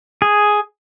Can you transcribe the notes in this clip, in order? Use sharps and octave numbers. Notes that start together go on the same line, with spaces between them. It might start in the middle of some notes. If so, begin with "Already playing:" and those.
G#4